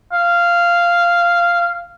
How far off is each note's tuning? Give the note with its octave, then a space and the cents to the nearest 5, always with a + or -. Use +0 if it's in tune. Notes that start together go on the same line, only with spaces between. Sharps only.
F5 -10